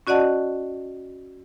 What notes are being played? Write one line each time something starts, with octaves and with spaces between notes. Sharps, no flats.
C#4 F#4 D5 D#5 F#5 A5